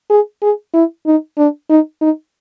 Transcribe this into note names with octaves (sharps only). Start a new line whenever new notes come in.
G#4
G#4
E4
D#4
D4
D#4
D#4